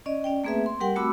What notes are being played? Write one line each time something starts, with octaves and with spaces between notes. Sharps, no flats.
C#4 D5 D#5
C#4 D5 G5
A3 A#3 C4 G#4 B4 E5
C6
G3 G4 A#4 F#5 G5
A3 C4 F#4 B5 D6 E6